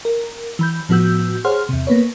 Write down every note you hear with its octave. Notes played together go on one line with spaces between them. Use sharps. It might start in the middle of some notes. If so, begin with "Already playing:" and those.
A#4
E3 B5 G6
A2 F3 B3 F#4 E6 G6
G#4 C5 C#5 F#5 C6 F6
E2 C3
A#3 B3 B4 C#5